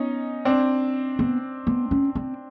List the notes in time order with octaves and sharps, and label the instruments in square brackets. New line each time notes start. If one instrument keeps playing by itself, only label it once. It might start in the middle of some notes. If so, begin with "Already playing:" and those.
Already playing: [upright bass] B3 [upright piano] C#4 D#4
[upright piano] C4 D4
[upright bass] B3
B3
C#4
C4